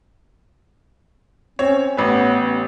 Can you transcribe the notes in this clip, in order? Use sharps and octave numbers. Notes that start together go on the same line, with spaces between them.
C4 C#4 C#5
A1 B3 B4